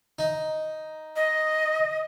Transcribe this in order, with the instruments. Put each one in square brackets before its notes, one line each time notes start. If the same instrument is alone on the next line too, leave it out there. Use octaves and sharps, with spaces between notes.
[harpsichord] D#4
[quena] D#5